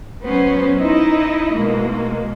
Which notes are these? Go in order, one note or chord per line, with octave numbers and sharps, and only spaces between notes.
F#3 B3 C#4 C5
D#4 E4 D#5
B2 G#3 A#3